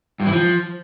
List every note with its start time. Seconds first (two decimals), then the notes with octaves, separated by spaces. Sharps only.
0.20 G2
0.26 E3
0.32 F3